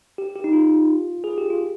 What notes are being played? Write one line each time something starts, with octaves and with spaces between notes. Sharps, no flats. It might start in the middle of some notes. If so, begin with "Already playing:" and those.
G4
G4
D#4
F4
G#4
G4
F4